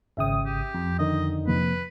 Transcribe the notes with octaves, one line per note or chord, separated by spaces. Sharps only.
G#1 C#3 E5 G5 D#6
G4
F2
D3 D#3 D#4 D#5
C3 F3 A#3 B4